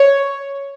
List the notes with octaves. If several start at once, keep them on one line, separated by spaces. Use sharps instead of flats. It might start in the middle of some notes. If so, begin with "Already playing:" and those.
Already playing: C#5